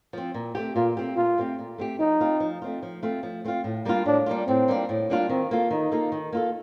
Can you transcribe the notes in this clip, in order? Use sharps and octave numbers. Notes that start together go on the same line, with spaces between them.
F3 C4
A#2
A3 C4 G4
A#2 F4
A3 C4 G4
A#2 F4
A3 C4 G4
A#2
A3 C4 G4
F3 D#4
A3 C4 F4
F3
A3 C4 F4
F3
A3 C4 F4
F3
A3 C4 F4
A2
G3 A#3 D4 F4
A2 D4
G3 A#3 D4 F4
A2 C4
G3 A#3 D4 F4
A2
G3 A#3 D4 F4
D#3 C4
A#3 F4 A4
D#3 D#4
A#3 F4 A4
D#3
A#3 F4 A4